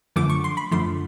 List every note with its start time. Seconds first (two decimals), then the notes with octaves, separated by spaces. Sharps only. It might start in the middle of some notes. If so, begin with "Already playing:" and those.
0.16 F#2 D3 F3 A3 D6
0.30 C#6
0.44 C6
0.57 B5
0.71 F#2 D3 F3 A3 C6